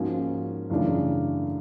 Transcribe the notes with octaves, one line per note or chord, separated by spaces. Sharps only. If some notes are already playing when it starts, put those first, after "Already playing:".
Already playing: G#2 F3 A#3 C#4 F#4
F#2 C#3 E3 A3 D4